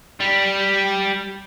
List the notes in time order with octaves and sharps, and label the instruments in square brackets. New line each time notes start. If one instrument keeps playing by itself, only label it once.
[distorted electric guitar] G3